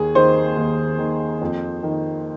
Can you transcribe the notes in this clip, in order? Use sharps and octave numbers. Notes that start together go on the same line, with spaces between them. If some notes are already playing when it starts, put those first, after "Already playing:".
Already playing: D#2 G#4
D#3 C5
D#2
D#3
F2
D#3